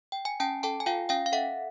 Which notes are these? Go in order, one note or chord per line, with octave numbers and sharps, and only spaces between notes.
G5
G#5
C#4 G5 A5
A4 G5 A5
G#5
F4 F5 G5
C#4 F5 G5
F5
A4 E5 F#5